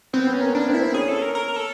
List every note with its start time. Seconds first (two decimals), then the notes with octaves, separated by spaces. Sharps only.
0.13 B3 C4 B4
0.27 B3 B4
0.33 C#4
0.41 A#3 A#4
0.53 D4 A#4
0.60 B4
0.68 C4 C5
0.74 E4
0.81 C4 C5
0.94 C#4 G#4 C#5
1.08 A4
1.22 A#4
1.35 A#4
1.48 A#4
1.56 A4